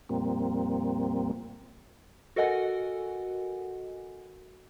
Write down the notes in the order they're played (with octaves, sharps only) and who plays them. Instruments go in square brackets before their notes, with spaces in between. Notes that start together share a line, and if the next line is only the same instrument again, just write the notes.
[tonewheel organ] F2 A#2 G3 A#3 C4
[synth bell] F#4 A4 A#4 D#5 F#5 G#5